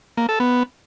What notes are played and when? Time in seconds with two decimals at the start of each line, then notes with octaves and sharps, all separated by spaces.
0.17 A#3
0.29 A4
0.40 B3